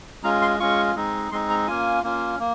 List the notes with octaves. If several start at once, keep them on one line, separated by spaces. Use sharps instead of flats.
G#3 C#4 F4 A#5
C6
G#3 C#4 F4 C#6
G#3 C4 D#4
G#3 C4 D#4 C6
A#5
A#3 C#4 F4 G#5
A#3 C#4 F4
A#3